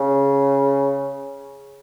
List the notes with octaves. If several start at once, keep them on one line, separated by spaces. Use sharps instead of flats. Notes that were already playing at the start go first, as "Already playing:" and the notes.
Already playing: C#3